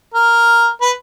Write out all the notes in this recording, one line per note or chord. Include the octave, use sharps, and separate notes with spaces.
A#4
B4